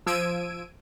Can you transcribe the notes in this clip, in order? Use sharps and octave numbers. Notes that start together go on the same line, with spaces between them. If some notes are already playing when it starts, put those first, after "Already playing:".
F3 E6 G#6 D7 D#7